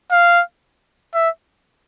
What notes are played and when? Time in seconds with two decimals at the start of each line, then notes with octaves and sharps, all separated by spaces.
0.12 F5
1.14 E5